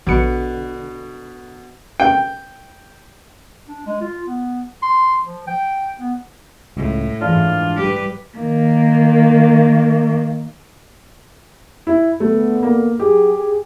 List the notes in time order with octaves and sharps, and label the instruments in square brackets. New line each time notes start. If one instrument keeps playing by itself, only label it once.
[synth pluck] A#1 C#7 [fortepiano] B2 B4 [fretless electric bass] D3
[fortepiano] G5
[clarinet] D4
G#3
F4
B3
C6
F3
G5
B3
[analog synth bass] C#2 [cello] A2
[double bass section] G#2 E3 F3 [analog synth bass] D4 [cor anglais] F4
[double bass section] G3 [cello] G4 B4
[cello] D#3 A#3
[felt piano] E4
[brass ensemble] D3 B3 [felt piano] A3
[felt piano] A#3
[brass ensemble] F#3 G#4 [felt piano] G4
[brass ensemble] G#4